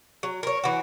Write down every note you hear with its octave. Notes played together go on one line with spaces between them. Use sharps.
F#3
A#4 C#5
E3 F#4